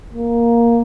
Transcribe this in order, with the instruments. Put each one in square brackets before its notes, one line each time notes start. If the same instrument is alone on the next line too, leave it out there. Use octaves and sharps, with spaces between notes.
[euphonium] A#3